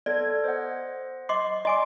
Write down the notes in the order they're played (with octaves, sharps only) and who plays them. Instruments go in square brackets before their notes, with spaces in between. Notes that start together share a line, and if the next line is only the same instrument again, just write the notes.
[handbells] B3 A4 G#6 [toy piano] D5
[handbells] C5 D#5 F#5
[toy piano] D#5 C6 D6 [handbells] C7
[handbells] D5 A#5 C6 [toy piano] D#5 G#5 D6